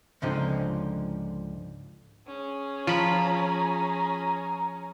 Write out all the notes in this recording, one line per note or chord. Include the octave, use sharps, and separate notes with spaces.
C#2 G#2 D3 F3 C4 D#4
C#4 G#4
F3 F4 A#5 B5